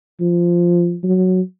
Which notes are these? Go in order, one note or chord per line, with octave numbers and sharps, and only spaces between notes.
F3
F#3